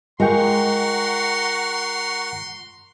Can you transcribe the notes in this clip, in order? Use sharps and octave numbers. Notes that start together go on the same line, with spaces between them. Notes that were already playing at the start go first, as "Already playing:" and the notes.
G#3 F4 A#4 F#5 G5 A#5 C6 C#6